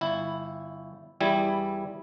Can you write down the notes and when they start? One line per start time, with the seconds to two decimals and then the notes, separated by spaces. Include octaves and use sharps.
0.01 G1 E4
1.20 E2 G3 E4 G#5